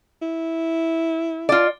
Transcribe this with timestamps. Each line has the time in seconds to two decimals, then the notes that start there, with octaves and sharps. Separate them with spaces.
0.22 E4
1.49 F4 D5